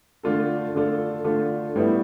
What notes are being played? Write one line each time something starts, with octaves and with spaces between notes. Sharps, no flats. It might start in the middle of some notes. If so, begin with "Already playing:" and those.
D3 A3 D4 F4 A4
D3 A3 D4 F4 A4
D3 A3 D4 F4 A4
A2 G3 B3 E4